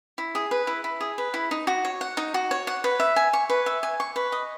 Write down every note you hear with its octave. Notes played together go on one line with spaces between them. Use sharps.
E4
G#4
B4
E4
E4
G#4
B4
E4
D#4
F#4
C#5
F#5
D#4
F#4
C#5
F#5
B4
E5
G#5
C#6
B4
E5
G#5
C#6
B4
D#5